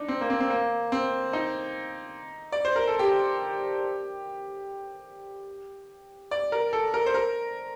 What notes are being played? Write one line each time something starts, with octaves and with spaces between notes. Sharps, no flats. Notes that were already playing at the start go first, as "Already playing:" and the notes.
Already playing: D4 D#4
C4
A#3
C4
C4
A#3
C4
D#4
D5
C5
A#4
A4
G4
D5
A#4
A4
A#4
C5
A#4